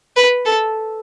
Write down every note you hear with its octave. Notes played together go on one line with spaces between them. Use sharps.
B4
A4